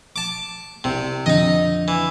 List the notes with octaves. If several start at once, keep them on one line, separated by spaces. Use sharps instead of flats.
A5 D6
C2 C3
F2 D3 D#4 D#5
E3